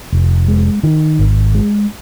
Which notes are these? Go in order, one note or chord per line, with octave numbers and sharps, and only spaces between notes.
F1
G#3
D#3
G#1
G#3